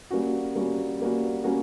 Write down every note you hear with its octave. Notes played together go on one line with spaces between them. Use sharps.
G3 A#3 C#4 F#4
G3 A#3 C#4 F#4
G3 A#3 C#4 F#4
G3 A#3 C#4 F#4